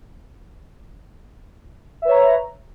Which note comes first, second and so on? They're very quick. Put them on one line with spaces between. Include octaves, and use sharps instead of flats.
E5 B4 C#5 A#5